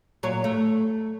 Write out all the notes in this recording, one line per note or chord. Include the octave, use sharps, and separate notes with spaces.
A#2 F#3 C#5
A3